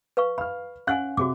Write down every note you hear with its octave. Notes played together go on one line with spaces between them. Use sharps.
B4 F5 C#6
F5 B5 F6
C#4 F5 F#5 G#5 F#6
C3 F#4 G#4 D6